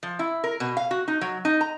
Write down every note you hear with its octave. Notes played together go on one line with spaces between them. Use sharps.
F3
E4
A#4
B2
F5
F#4
D#4
F#3
D#4
A#5